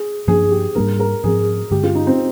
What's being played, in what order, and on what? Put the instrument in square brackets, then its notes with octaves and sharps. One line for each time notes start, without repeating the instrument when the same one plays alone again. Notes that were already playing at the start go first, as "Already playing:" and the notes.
Already playing: [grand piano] G#4
[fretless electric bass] G2 F3 A#3 D4 [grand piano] G#4
[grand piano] G4
[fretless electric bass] G#2 G3 A#3 D4 [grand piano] A#4
[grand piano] A#4
[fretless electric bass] G#2 F3 C4 [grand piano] G#4
[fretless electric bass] G2 D3 G#3 [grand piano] G4
[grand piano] F4
D#4
C4